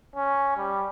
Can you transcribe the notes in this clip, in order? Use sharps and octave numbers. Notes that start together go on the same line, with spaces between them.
C#4
G3